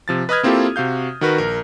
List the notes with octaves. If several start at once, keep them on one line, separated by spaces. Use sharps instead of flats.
C3 F3 A6
B4 D#5 B5 D#6 F6 G#6
A#3 C4 E4 F4 G4 A4
C3 F#4 F5 G6
D#3 F#4 A#4 B4
A#1 A#4